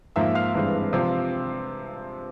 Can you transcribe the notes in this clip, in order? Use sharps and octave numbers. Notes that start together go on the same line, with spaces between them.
G#2 F3 A#3 E5 E6
F5 F6
G2 E3 G#3 C4
C3 F3 C4